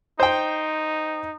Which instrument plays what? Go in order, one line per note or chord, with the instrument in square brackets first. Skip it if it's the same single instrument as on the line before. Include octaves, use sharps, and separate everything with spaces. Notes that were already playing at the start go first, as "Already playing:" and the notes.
[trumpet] D#4 [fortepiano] C5 G5